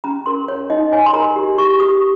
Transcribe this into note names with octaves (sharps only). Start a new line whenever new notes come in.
C#4 A#5
A#4 C6
C#5
D#4 D#5
C#5 G#5
C6
A#4 A#5
G4
G4 C#6
G4 D#6